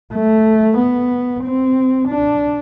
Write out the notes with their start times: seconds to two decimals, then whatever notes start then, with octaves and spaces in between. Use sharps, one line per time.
0.14 A3
0.79 B3
1.44 C4
2.09 D4